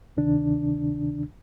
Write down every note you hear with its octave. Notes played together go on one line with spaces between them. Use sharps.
D2 C3 D#3 D4